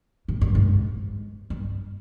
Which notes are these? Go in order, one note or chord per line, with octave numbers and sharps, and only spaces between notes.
G#2
G2
G#2
G2